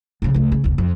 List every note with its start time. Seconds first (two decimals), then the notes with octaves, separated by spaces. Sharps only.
0.22 A#1 C#3
0.34 C#2 A3
0.52 C#3
0.64 F1 D2
0.78 F2